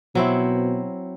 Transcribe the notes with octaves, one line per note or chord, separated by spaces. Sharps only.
B2 F#3 C4 E4